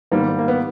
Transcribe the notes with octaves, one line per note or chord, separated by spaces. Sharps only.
G#2 D#3 G3 A#3 B3
A#3
B3